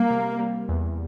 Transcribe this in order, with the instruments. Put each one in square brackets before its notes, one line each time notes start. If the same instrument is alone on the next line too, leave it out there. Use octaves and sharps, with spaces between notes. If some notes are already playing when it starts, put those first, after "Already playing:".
Already playing: [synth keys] G3 [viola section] A#3
[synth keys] C3
G3
E2